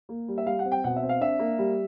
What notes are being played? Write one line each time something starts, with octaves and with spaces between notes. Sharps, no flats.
A#3
G3
E5
G3 F5
F#5
C4
G5
B2 F#5
E5
C4
F5
D4 E5
A#3
G3